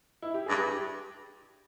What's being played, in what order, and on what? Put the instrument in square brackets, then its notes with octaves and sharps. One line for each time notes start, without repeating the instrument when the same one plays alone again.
[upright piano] E4
G4
[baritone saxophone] G2 [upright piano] G#4
[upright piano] G4